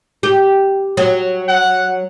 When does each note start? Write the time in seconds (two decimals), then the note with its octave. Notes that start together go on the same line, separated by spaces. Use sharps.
0.23 G4
0.97 F#3
1.48 F#5